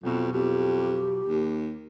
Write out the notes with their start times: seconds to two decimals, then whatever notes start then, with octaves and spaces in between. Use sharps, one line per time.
0.03 B1 F2 B2
0.32 F2 G4
1.26 D#2